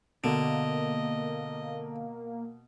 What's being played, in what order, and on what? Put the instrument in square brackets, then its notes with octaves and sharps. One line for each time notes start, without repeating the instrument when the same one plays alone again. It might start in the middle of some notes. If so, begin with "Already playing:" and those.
[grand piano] B2 [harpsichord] D3 [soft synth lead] A#3 [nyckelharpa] D#5